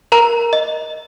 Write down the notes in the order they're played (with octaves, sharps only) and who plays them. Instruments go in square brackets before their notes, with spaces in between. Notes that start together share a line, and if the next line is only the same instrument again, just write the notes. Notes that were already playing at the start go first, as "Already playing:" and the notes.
[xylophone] A#4 A#5
D#5